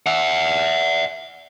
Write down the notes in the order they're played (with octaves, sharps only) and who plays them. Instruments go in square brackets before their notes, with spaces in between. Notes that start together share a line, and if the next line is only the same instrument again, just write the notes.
[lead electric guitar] E5 F#5